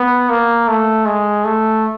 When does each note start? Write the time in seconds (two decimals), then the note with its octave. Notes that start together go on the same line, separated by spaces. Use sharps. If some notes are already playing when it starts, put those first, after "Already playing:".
Already playing: B3
0.29 A#3
0.68 A3
1.06 G#3
1.45 A3